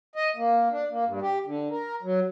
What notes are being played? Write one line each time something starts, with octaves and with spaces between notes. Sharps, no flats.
D#5
A#3
D4
A#3
G2
G4
D3
A#4
F#3